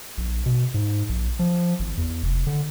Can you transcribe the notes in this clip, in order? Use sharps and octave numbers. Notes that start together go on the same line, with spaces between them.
A#1
B2
G#2
A#1
F3
G#1
E2
F1
D3